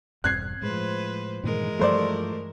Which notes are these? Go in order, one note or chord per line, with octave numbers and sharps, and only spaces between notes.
E1 G2 C4 F#6 G#6 C7
A2 F3 G#3 B4 C5
G2 A#2 D#3 E3 G#3 A#4
G2 F3 G3 A3 C5 D5